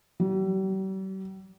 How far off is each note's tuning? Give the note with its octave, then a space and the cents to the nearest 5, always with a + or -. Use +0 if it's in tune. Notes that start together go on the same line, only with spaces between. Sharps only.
G3 -45